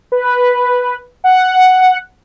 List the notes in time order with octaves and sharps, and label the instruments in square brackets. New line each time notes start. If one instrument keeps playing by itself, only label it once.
[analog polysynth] B4
F#5